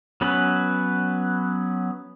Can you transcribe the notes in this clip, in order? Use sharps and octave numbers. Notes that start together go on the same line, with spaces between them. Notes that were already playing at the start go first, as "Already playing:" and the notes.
F#3 B3 C#4 B4